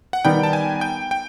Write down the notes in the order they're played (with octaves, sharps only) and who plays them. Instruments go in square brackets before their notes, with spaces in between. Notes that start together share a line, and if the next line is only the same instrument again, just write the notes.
[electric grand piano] F#5
[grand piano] D#3 G3 B3 [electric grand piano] G5
[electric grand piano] A5
G#5
G5
G5